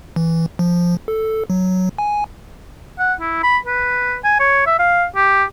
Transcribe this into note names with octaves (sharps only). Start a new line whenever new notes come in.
E3
F3
A4
F#3
G#5
F#5
E4
B5
B4
G#5
C#5
E5
F5
G4